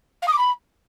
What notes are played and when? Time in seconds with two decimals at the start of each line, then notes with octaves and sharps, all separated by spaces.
0.22 F5
0.27 D#6
0.33 D6
0.38 B5